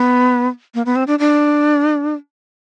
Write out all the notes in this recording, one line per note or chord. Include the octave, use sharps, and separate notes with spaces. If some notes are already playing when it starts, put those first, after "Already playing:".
Already playing: B3
A#3
B3
C4
D4
D4